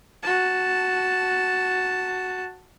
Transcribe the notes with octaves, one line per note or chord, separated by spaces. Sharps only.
F#4 A5